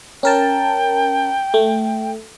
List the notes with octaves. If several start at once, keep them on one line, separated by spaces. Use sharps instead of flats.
C#4 A#4 G5 A5
A3